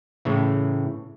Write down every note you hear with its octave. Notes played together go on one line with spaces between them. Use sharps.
A2 C#3 E3